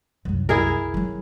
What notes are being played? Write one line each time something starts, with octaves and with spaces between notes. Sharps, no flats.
C2 F#2
E4 G#4 A#4
F#3 C4